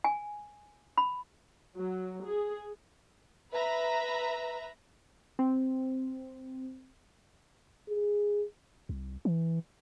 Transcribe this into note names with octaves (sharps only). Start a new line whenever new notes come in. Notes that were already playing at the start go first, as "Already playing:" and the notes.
G#5
B5
F#3
G#4
B4 E5 A#5 B5
C4
G#4
C2
E3